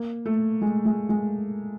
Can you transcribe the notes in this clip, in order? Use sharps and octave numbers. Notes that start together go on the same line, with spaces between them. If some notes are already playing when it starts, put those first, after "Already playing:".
Already playing: A#3
A3
G#3
G#3
G#3